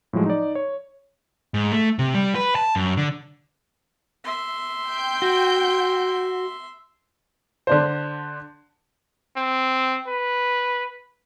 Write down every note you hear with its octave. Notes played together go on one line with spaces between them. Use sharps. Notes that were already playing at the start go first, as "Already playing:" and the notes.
A2 F3 F#3 G#3
D#4 D5
C#5
G#2
A3
C3
G3
B4
A5
F#2
D3
E5 C6
G5 G6
F#4
D3 D4 C5
C4
B4